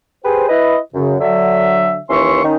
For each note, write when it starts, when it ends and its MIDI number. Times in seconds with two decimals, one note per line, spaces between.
0.25 0.48 67
0.25 0.48 68
0.25 0.48 71
0.25 0.48 72
0.49 0.78 64
0.49 0.78 71
0.49 0.78 75
0.94 1.15 42
0.94 1.15 49
1.20 1.98 50
1.20 1.98 54
1.20 1.98 76
2.09 2.43 39
2.09 2.43 52
2.09 2.43 61
2.09 2.43 76
2.09 2.43 84
2.09 2.43 85
2.44 2.56 51
2.44 2.56 61
2.44 2.56 63